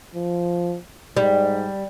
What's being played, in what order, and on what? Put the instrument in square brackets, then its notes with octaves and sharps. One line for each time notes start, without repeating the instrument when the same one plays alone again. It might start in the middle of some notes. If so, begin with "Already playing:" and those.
[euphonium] F3
[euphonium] G#2 [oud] G3